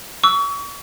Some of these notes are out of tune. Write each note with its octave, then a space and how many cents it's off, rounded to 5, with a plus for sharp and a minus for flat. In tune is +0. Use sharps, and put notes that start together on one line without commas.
C#6 +35 E6 -5